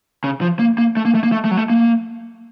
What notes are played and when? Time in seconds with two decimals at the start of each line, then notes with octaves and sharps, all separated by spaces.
0.24 C#3
0.41 F3
0.59 A#3
0.78 A#3
0.97 A3
1.05 A#3
1.15 A3
1.23 A#3
1.32 A3
1.45 A3
1.51 F#3
1.57 A3
1.70 A#3